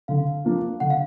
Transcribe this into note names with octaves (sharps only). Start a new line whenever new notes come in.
D3 F5
F3 A#3 D4
D3 F#5
F5